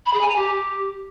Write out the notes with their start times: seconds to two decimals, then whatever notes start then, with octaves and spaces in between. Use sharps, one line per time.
0.05 B5
0.13 G#4
0.20 G#5
0.28 A#5
0.36 G4